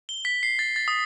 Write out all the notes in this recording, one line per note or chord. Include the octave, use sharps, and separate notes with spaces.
G7
B6
C7
A6
A6
D#6